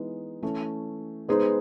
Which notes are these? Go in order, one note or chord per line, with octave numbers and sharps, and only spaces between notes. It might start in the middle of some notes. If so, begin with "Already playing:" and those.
Already playing: E3 G#3 B3 D#4
E3 A3 C#4
G#3 B3 D#4 G#4 C5